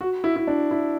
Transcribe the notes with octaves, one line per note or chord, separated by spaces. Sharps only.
F#4
E4
E4
D4
E4